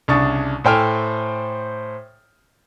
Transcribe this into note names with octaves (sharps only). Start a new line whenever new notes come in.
C2 C#3 D4 C#6 D#6 A6
A2 A4 C5 G5 G#5 F6